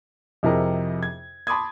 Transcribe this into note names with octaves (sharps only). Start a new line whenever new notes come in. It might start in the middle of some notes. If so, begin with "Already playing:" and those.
F2 C3 E4 G#4 A#4 D#5
G#6
A5 B5 C6 D6 D#6 G#6